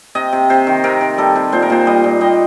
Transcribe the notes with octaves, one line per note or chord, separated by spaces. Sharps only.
C3 D#5
C3
C3 C5
D#3
C3 A#4
C3
G3 A4
C3
A#2 C5
A#4
A#2 C5
G3 D#5
A#2
G3 D#5